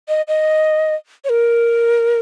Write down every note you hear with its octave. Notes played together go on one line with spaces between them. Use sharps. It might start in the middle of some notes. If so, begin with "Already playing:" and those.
D#5
D#5
C#5
A#4